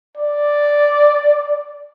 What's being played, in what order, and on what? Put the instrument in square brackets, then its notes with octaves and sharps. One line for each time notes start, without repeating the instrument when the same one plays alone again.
[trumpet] D5